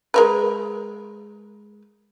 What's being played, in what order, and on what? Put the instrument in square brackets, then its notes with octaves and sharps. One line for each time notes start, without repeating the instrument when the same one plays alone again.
[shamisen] G#3 A#4 B4